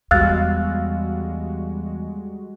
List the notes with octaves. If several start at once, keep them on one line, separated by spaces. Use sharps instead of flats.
E2 G3 G#3 F#4 F5 E6 F#6 A6